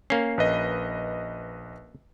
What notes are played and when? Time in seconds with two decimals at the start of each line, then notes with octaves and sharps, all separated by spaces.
0.10 A#3 C#4 C7
0.38 A#1 B4 D#5